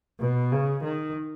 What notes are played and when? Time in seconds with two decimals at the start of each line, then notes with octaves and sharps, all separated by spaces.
0.20 B2
0.52 C#3
0.84 D#3